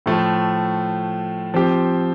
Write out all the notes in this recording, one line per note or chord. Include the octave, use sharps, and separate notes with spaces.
A2 F3 A3
F3 C4 G4